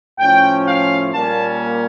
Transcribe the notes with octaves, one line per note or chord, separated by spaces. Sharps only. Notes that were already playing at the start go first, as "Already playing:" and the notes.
A2 F3 C#4 G5
F5
A#2 G3 A#3 C#4 A5